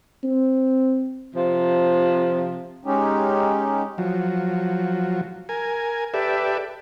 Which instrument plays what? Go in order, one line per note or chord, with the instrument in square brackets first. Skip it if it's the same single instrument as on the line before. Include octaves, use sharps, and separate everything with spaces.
[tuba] C4
[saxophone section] C3 F3
[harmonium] G#3 C#4 D#4 G4
[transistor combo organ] F3 F#3
A#4 G#5
G4 A4 B4 D5 E5